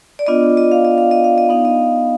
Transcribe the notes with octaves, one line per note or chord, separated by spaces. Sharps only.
D5
B3 D4 F4 D#5
D#5
F5
D#5
F5
D#5
F5
D#5
B3 D#4 F5
D#5